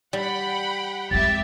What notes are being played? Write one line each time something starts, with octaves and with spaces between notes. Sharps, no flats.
G3 F#5 G5 B5
F2 G#3 G4 E5 A6